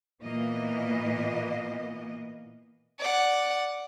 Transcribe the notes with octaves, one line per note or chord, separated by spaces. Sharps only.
A#2 E3 A#3 B3 D#5
D5 F#5